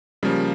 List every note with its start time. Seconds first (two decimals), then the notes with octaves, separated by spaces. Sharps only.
0.23 C#3 F3 G3 A#3 C#4